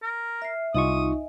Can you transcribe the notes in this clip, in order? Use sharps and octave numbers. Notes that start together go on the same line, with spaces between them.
A#4
E5 F6 C7
C2 D#4 F4 D#5 E5 G#5 C#6 D#6